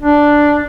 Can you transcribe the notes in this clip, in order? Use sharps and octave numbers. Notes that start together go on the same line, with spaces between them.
D4